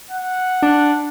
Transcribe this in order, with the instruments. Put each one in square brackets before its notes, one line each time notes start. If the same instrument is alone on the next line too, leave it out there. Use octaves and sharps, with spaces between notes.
[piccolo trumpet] F#5
[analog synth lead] D4